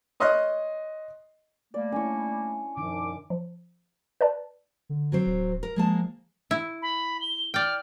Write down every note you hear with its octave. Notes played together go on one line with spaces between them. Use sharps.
C#5 D#5 C6 D#6 F6 F#6
G3 A3 A#3 D5
C#4 D4 E4 G#5 C#6
F#2 B2 D#3 F3 D4 D6
F3
B4 D5 A5
D3
F#3 C4 C5
D1
A#4
F3 G#3 A#3 A5
E4
B5
G7
D5 G5 F6